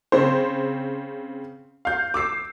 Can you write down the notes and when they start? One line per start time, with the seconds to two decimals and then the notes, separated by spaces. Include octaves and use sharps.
0.12 C#3 C4 C5
1.85 F5 G6
2.14 D6 E6 C7